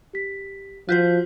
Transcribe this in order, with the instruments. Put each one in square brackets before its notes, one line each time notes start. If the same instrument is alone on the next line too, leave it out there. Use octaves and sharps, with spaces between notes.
[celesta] G4 B6
[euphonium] F3 [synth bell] F4 F#4 C5 [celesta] F#6 G6 B6